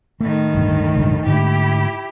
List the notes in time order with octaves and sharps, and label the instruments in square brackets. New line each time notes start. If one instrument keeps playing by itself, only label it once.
[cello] A2 D#3 [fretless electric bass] A3
[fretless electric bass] D1 G1 G2
E1 C#2 G2
[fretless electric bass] G#2 D3 A3 [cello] E4 G4